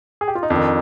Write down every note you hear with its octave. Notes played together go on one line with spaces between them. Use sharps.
G#4
G4
F4
D#4
F2 D#3 D4